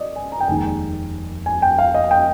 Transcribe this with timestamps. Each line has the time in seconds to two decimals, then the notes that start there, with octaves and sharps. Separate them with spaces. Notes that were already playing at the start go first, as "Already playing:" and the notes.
Already playing: D5 D#5
0.16 G#5
0.32 A#5
0.41 G5
0.48 F1 D#2 D#3 G#3 D#4 G#5
1.46 G#5
1.62 G5
1.79 F5
1.95 D#5
2.11 G5